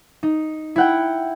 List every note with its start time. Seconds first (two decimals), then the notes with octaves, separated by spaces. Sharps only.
0.23 D#4
0.76 E4 F#5 G5